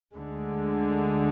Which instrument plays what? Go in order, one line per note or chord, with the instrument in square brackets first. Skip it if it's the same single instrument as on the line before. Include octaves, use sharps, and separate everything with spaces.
[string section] D2 D3 G#3